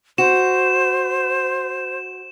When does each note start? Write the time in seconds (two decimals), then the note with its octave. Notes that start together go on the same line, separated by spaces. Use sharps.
0.18 F#4 C5 E7